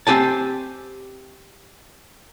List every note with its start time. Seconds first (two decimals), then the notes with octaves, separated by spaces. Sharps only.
0.07 C4 G4 G#5 A5